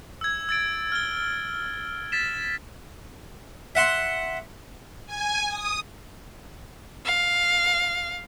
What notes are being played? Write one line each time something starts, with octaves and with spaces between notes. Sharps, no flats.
E6 G#6
E6 A6 D7
F6 G7
A6 B6 E7
E5 F#5 C6
G#5
D#6
F5